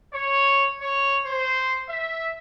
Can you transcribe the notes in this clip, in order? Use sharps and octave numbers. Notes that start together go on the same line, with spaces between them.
C#5
C#5
C5
E5